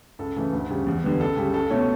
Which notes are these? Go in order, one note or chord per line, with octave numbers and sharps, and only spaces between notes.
C#2 A4
C#3 E3 A3
D2
C#3 G3
E2
D3 G3 B3
C#2 A4
C#3 G3
C#2 A4
B2 A3 C#4 C#5